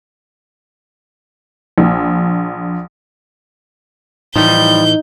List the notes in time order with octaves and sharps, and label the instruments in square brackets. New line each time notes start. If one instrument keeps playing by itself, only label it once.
[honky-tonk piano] A#1
[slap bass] A2 E3 [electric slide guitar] F3 G3 [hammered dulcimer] D#4 [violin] G6